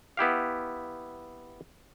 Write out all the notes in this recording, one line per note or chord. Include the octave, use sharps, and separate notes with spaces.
B3 E4 G4 F5